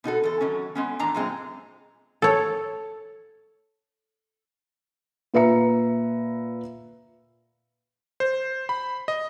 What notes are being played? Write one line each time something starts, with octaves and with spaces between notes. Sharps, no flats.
B2 D#4 F#4 A4
E2 A4
D#3 F#3 C#4
G#3 B3 C#4
E2 A2 D#3 D4 A5 A#5
F#2 A#2 G#3 C4
A4 C#5
A#2 B4 E5 A#5 C#7
C5
B5
D#5